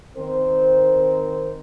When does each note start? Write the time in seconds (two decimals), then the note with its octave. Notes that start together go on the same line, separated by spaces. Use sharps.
0.16 D#3 C4 A#4 C5